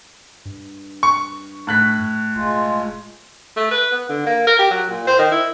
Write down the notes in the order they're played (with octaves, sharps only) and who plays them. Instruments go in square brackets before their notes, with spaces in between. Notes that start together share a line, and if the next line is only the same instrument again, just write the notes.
[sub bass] G2
[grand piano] C#6
[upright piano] A2 F#6 B6
[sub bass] E1 [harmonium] G#3 F4
[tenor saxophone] A3
B4
B3
D3
A#3
A#4
G4
F#3
A#2
C5
D#3
E4